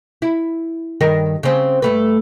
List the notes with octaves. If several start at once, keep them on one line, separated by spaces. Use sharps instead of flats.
E4
G2 D#3 A#4
C#3 C4
G2 A3 B4